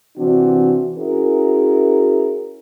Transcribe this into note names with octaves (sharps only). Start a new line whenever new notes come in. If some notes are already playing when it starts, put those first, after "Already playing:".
C3 E3 C4 D4 F#4
C#4 E4 F#4 G#4 A#4